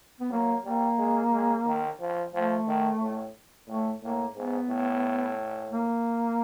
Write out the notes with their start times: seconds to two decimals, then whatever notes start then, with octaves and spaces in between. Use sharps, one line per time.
0.20 B3
0.31 F#3 A#3
0.65 G3 A#3
0.98 G#3
1.32 G#3
1.66 D#3
2.00 F3
2.33 F3 A3
2.67 D#3
3.01 A2
3.68 A2 A3
4.02 A2 A#3
4.35 G#2 B3
4.69 A2
5.70 A#3